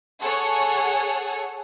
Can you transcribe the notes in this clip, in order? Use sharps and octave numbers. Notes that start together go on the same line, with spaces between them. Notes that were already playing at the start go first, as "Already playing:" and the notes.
G#4 A4 C#5 F#5